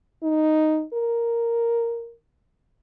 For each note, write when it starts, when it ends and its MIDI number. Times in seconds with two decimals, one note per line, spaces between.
0.23 0.84 63
0.93 2.14 70